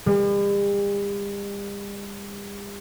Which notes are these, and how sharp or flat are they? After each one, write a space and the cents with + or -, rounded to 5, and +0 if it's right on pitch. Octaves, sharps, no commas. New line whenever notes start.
G3 +45